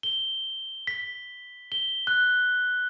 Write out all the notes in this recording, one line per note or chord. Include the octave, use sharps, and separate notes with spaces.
G7
B6
G7
F#6